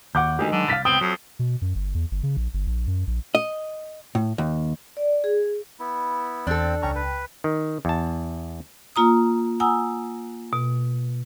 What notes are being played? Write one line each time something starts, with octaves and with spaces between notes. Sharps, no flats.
D#2 F#5 D6 G6
D2 D#3 G#3 G4 D#5 G#5
D3 F#3
C2 F5 A6 B6
C#2 B3 C4 G5 D#6
F2 F#3
B2
F#2
G1
E2
G1
C#3
A#1
G1
A#1
F#2
A#1
D#5
A2
D#2
D5
G#4
B3 E4
E2 C4 D4 A4 G5
C#2 C#4 G5 A5 A#5 C#6
B4
D#3
E2 A5
A#3 F4 A#5 D#6
F#5 G#5 A#5 D#6 E6
B2